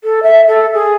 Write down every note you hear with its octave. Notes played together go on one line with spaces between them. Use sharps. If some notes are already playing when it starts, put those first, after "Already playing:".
A4
E5
A4
G#4